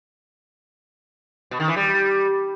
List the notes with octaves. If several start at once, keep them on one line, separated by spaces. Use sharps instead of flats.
B2
D#3
E3
G3